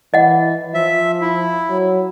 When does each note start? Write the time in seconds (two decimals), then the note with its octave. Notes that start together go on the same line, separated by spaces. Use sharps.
0.14 E3 D#5 F#5
0.74 F3 E5
1.21 E4
1.69 F#3